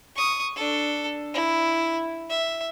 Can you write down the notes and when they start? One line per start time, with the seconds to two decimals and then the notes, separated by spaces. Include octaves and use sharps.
0.16 C#6 D#6
0.56 D4 A4
1.34 E4
2.30 E5